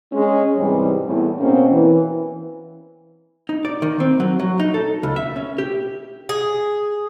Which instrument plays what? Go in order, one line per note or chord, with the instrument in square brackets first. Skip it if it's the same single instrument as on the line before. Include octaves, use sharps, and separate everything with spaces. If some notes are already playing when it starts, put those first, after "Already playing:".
[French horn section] G#3 C#4
G#2 C3 E3 G3
E2 A2
B2 A#3 C4 C#4
E3
[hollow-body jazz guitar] D#4
D5
D#3
C4
F#3
F#3
D#4
A4
C#2
E5
C#4
G4
[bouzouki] G#4